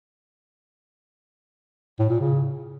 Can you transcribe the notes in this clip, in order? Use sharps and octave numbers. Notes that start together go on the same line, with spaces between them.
A2
A#2
C#3